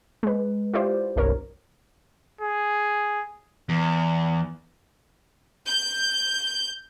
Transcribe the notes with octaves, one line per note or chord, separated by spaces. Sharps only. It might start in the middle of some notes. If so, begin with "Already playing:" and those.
G#3 B4
E4 F4 G4 C5 D5
G1 C2 G2 A#4 C#5
G#4
E2
G6